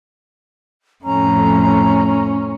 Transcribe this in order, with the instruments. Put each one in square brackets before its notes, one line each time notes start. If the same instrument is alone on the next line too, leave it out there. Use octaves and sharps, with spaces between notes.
[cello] F2 A2 [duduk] C#4 [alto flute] A#5